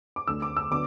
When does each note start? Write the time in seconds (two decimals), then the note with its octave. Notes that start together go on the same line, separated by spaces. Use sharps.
0.16 D6
0.27 D2 D3 A3 E6
0.42 D6
0.57 E6
0.71 D3 F#3 B3 D6